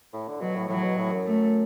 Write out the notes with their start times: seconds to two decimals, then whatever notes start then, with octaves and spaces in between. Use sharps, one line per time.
0.13 A2
0.28 D3
0.41 B2 F#3
0.56 A2
0.69 A2 F#3
0.83 B2
0.98 A2
1.12 F#2
1.26 A3